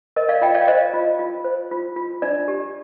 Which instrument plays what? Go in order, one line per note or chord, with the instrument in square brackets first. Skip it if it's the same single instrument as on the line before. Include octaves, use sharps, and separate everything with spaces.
[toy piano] A#4 D#5
D5 F5
F4 D#5 G5
D5 F5
C5 D#5
F4
F4
C5
F4
F4
D4 D5
G4